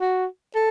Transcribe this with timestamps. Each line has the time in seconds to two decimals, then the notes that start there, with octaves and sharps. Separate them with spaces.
0.01 F#4
0.55 A4